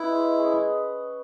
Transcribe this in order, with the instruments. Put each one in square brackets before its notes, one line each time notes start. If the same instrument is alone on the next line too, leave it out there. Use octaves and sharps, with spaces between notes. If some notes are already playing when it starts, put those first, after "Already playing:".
Already playing: [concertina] E4 [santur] B4 D#5
[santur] G#3
C#4 G#4 D#5